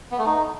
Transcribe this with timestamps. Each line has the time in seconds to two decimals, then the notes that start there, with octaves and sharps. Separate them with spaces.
0.11 B3
0.19 A3
0.26 D#4